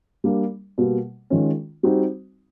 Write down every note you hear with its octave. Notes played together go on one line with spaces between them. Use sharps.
G3 A#3 D4
B2 G3 A#3
D#3 G#3 C#4 F4
G3 C4 D#4 F#4